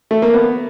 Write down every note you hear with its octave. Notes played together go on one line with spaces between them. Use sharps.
A3
A#3
B3